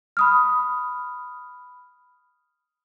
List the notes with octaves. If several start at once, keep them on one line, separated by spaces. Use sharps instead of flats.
B5 D#6 F6